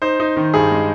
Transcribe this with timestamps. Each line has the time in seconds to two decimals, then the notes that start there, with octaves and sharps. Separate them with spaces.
0.02 D#4 C5
0.20 D#4
0.37 D#3
0.54 G2 G#4
0.71 G#3